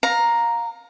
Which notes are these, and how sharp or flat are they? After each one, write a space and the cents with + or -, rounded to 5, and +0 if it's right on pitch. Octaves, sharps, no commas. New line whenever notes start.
F5 +25 A#5 +0